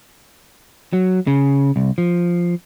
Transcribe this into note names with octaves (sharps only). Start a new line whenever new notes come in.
F#3
C#3
C2
F3